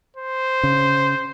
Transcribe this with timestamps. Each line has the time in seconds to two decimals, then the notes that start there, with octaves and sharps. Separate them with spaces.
0.17 C5
0.63 C#3